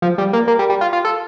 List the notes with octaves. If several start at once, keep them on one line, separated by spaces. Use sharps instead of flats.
F3
G3
A#3
A#3
G3
G3
F4
F4
A4